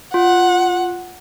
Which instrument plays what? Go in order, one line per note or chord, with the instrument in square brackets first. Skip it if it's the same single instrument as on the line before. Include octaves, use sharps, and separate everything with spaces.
[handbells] F4 [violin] F#5